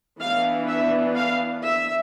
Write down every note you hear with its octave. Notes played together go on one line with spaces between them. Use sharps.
E3 B3 D4 F5
E5
F5
E5